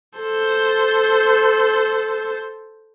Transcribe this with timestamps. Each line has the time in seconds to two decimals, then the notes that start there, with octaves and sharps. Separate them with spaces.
0.19 A4 C5